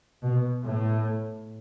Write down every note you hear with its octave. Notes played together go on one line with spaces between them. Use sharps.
B2
A2